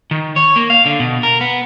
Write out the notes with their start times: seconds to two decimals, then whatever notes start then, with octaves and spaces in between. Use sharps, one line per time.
0.11 D#3
0.36 C#5
0.56 A#3
0.70 F5
0.86 D3
1.00 B2
1.23 A#4
1.41 B3